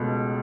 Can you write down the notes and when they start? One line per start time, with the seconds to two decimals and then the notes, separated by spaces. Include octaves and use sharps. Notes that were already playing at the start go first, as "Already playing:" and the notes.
Already playing: C#2 B2 A3